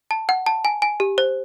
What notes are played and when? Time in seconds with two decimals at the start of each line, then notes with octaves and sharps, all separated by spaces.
0.11 A5
0.29 F#5
0.46 A5
0.65 G#5
0.82 G#5
1.00 G4
1.18 C5